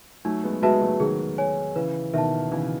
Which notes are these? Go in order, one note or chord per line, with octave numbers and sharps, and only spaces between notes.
F#3 A3 D#4
G#3 B3
G#3 B3 F#4 B4 E5 A5
F#3 A3
G#3
D#3 F#3 G#4
C#5 G#5
C#3 E3 B4
B2 D#3 E5 A5
C#3 E3 D#4